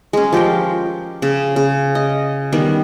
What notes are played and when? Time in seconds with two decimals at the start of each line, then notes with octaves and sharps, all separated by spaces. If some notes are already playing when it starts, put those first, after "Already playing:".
0.13 G#3 C#4
0.33 F3 G4 A#4 G5
1.22 C#3
1.56 C#3
1.95 D#5
2.52 D#3 G3 B3